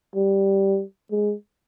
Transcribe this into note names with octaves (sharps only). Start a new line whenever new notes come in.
G3
G#3